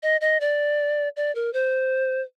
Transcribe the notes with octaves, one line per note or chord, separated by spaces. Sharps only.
D#5
D#5
D5
D5
A#4
C5